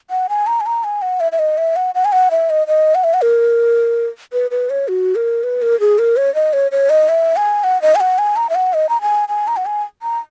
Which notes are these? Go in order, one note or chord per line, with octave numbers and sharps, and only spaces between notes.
F#5
G#5
A#5
G#5
A#5
G#5
F#5
E5
E5
D#5
E5
F#5
F#5
G#5
F#5
E5
D#5
D#5
F#5
E5
F#5
A#4
B4
B4
C#5
F#4
A#4
B4
A#4
G#4
A#4
C#5
D#5
C#5
C#5
D#5
E5
G#5
F#5
D#5
G#5
F#5
G#5
A#5
E5
F#5
D#5
A#5
G#5
G#5
A#5
F#5
G#5
A#5